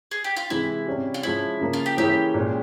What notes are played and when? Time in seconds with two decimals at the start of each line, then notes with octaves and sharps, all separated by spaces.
0.11 G#4
0.24 G4
0.36 F4
0.50 C3 E3 G#3 E4
0.87 C3 G3 C#4 G4
1.14 F4
1.23 F3 G#3 C#4 E4
1.60 C#3 F3 A#3
1.73 F4
1.86 G4
1.97 E3 A#3 C#4 E4 G4 G#4
2.34 A#2 G#3 C#4